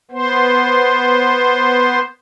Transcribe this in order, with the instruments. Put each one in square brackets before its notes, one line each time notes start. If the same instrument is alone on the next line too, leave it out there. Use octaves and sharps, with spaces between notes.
[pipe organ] B3 C5